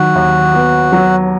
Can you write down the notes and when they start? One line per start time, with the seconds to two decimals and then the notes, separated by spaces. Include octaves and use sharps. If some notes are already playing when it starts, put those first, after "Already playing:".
Already playing: D#3 F#3 F#4
0.15 D#2
0.54 B3
0.92 F#3